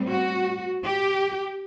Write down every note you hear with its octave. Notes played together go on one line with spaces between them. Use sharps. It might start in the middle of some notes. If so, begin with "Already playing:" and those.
Already playing: A2 G3 C4
F#4
G4